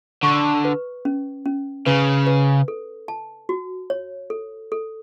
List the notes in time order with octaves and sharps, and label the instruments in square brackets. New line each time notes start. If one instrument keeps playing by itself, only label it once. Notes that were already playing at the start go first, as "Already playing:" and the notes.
[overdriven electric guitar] D3 [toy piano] C#6
[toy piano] B4
C#4
C#4
[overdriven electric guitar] C#3 [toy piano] B4
[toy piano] B4
A4
A5
F#4
C#5
A4
A4